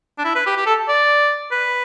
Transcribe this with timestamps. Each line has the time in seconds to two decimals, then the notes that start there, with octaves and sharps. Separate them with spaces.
0.19 D4
0.24 E4
0.35 B4
0.46 G4
0.57 G4
0.66 A4
0.89 D5
1.51 B4